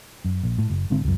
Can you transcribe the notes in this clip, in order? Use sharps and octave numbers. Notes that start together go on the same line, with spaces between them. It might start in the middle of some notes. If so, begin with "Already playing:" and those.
F#2
A#1
A2
F#1
G#1 G#2 D3 C4
C#2 F#2